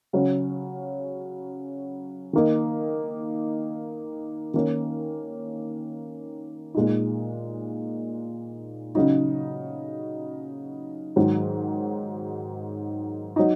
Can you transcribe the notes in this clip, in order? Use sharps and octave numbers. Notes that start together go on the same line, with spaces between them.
C#3 F#3 C#4
D#3 A#3 D#4
D#3 A#3 C#4
A#2 G#3 D#4
C#3 F#3 D#4
G#2 D#3 F#3
F#3 D#4